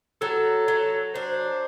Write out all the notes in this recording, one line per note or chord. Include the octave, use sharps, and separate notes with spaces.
F#3 A4
F#3
D4 C5